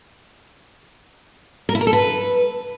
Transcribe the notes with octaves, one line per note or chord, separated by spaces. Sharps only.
A#4
E4
A#4
A4
B4